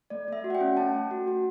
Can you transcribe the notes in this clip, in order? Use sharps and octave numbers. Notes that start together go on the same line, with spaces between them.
A3 D5
A3 E5
F#4
F#5
G5
C#4
A3 A5
A3
F#4
F#4